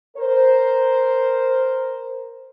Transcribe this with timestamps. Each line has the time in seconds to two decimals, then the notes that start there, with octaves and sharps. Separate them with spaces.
0.17 A#4 C5